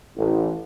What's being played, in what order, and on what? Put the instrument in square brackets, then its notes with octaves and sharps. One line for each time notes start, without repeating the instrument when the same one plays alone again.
[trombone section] A1